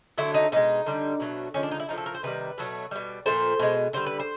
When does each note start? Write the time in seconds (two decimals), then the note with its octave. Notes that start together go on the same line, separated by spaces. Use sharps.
0.18 D3 F#3 A3 E4
0.34 D#4
0.52 B2 G#3 D#4
0.86 D3 G3
1.20 B2 F#3 A3
1.54 D3 F3 G#3 C#4
1.63 D4
1.71 D#4
1.80 E4
1.88 A2 F3 A3 D#4
1.98 A4
2.06 A#4
2.15 C5
2.23 C3 D#3 G3 B4
2.58 B2 F#3 A3
2.91 B2 G3
3.26 A#2 F3 A3 C5
3.59 B2 G#3
3.93 D3 G3 C5
4.06 B4
4.20 C5